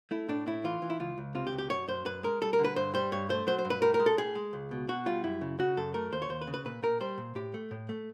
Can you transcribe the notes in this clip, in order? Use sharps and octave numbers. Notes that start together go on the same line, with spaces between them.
A3 E4
A2 D4
A2 E4
E3 F4
E3
E4
C#2 F4
C#2
C3 F4
G4
C#2
G4
F#2 C#5
F#2 C5
F#2 B4
G#3 A#4
G3 A4
A#4
D3
B4
G2 C5
G3 C5
G2 C#5
A3 C5
F#3 C5
C5
G2
B4
A2 A#4
A#4
G#3
A4
A2 G#4
G#3
C#2
B2
B2 F#4
G3 F4
F#2 E4
C#3
C#3 F#4
F#2 A4
A3 A#4
D#2 C5
C#5
D#2 C5
B4
C#3
B4
A#2 B4
A#2 A#4
G3 C5
A#2
A2 G4
A3
A2
A3